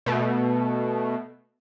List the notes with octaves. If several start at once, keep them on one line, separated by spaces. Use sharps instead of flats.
B2 A3